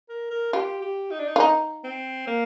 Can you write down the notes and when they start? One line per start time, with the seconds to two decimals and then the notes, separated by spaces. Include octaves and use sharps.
0.09 A#4
0.31 A#4
0.53 F4 G4
0.82 G4
1.11 D#4
1.20 D4
1.28 D#4
1.36 F4
1.40 D#4
1.84 C4
2.27 A#3